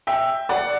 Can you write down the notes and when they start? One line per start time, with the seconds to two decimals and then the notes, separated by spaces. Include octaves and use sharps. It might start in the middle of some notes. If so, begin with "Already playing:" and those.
0.07 E5 G5
0.49 D5 F#5